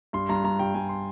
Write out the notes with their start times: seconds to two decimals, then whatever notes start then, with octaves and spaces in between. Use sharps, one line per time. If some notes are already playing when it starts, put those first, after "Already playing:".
0.13 G2 C6
0.29 G2 A#5
0.44 G2 A#5
0.59 G2 G5
0.74 G2 G#5
0.89 C6